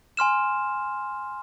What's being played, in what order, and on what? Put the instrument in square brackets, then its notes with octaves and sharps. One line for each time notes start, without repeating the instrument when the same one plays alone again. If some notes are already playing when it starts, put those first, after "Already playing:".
[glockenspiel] G#5 C6 F6 E7